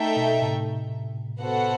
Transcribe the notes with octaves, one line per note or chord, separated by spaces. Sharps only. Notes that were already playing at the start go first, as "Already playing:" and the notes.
Already playing: A3 D#4 A4 E5 G5
B2
A2 C3
B3 F#4 A4 C5 F#5